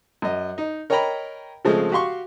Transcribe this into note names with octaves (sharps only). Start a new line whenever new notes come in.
F#2 D#5
D#4
A#4 C#5 D#5 G5 A#5 B5
C#3 F3 G#3 A3 C4
F#4 G4 F5 C6 C#6